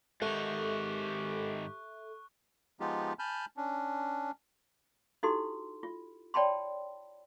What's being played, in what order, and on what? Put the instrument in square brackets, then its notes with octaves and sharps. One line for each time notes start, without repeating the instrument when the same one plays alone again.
[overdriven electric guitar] G#2 D#3 [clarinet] G4 [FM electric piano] A4 E5 [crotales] C#6 F#6
[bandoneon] F3 G#3 B3 D#4 F4 G4
G#5 A5 B5 F6 G6
C#4 D4
[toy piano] D#4 E4 F#4 G4 A4 C6
F4
C#5 D5 G5 A5 B5 C6